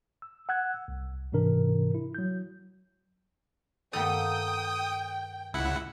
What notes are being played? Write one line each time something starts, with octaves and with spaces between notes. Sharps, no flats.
E6
F#5 E6 F#6 G#6
C2
G#2 C3 E3 D4 A#4
E4
F#3 G6
G2 D#3 A#3 B3 A4 G5 D#6
C#2 E4 F#5